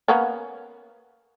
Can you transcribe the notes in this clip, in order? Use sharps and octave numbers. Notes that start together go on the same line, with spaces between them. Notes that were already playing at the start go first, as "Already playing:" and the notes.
A#3 B3 C#4